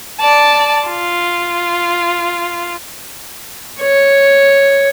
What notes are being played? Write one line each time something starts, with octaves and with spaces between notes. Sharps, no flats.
D5 A5
F4
C#5